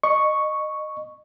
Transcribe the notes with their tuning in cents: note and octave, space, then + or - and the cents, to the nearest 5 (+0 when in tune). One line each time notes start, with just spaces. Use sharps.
D#5 -20 C#6 +0